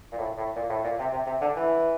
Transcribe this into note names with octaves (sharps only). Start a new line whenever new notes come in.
A#2
A2
A2
A#2
A2
A#2
C3
C3
C3
D3
E3